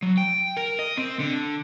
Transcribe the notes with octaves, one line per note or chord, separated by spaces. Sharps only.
F#3
G5
A#4
D#5
C4
D3